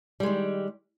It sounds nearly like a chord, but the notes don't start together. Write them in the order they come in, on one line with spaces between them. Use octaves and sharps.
G3 G#3 D#3